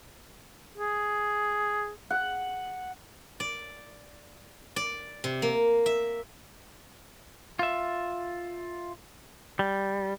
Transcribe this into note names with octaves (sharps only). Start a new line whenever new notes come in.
G#4
F#5
D5
D5
C3
A#3
E5
F4 E5
G3